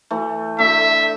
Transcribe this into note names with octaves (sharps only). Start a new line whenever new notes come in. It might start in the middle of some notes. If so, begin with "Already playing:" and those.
E3 A3
D3 A3 E5